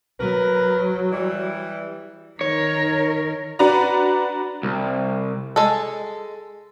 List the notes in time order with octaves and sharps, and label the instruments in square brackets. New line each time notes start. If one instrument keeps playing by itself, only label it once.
[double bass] F#3 [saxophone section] A#4 B4
[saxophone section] E3 G3
[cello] D#3 A#4 [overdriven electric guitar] C#5
[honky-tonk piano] D4 F#4 B4 D5 A#5
[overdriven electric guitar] C2
[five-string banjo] G#3 A4